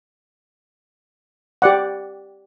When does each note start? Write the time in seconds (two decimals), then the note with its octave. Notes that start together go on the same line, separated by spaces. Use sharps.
1.62 G4 D5 F#5